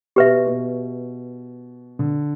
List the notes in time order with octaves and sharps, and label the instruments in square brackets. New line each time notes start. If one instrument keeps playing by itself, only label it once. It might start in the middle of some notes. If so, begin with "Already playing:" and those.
[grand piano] B2 [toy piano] G4 B4 E5
[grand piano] B2
D3